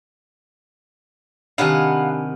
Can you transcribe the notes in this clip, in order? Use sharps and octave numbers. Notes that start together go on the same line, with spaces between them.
C3 D#3 B3 D4 G4 F5 F#5 G#5